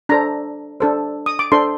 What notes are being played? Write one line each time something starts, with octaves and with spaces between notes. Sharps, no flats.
D4 A4 C5 A#5
D4 A4 C5
D#6
D6
D4 A4 C5 C6